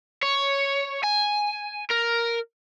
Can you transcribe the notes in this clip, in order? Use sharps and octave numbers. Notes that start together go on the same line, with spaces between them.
C#5
G#5
A#4